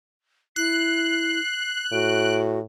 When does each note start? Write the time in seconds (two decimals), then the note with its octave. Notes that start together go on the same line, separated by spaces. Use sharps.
0.56 E4 F#6 C7
1.92 A2 F#4 D7